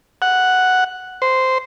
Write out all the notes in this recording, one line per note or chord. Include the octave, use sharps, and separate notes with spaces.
F#5
C5